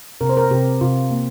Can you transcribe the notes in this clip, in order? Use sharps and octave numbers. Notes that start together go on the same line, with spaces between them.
C3 A#4
C5
A#4
C3 G4
C3 F4
A#3